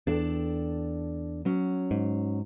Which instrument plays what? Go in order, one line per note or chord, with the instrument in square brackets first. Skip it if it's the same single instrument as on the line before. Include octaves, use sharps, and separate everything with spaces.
[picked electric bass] E2 [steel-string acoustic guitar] D4 A4 G5
[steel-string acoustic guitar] F#3 C#4
[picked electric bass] G#2